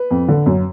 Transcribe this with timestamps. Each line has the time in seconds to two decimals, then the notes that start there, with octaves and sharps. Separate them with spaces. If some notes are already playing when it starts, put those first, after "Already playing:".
Already playing: B4
0.11 F2
0.28 D3
0.46 F#2